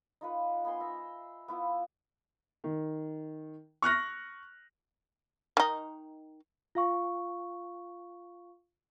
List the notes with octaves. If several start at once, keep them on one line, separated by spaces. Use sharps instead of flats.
D#4 F4 B4
B3 D#4 G#5 C6
E5 A#5
B3 E4 F4
D#3
C#6 F6 F#6 A#6
D#3 D#4
F4 F5 C#6